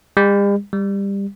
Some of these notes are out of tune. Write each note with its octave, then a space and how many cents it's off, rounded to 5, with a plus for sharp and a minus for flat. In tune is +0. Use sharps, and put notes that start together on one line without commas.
G3 +45
G3 +20